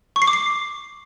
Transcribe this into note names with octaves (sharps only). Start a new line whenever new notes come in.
C#6
C7
D6
C7